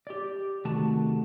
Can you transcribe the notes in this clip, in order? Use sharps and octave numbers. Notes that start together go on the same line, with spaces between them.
G4 D5
C3 D#3 A3 F#4 A5